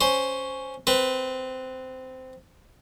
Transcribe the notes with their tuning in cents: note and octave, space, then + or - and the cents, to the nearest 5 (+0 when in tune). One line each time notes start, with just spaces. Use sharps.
C#4 +0 C5 +0
C4 -15 B4 +0